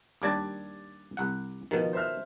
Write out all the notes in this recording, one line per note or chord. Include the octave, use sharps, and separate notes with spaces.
D#2 G3 D4 D6 G#6 A6
C2 F#5
B2 D#3 F3
C5 E5 F6